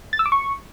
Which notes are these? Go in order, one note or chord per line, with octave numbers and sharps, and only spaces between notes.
A6
E6
D6
C#6